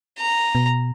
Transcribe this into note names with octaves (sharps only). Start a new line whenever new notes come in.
A#5
B2